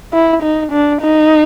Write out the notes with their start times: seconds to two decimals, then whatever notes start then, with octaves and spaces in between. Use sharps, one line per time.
0.13 E4
0.42 D#4
0.72 D4
1.01 D#4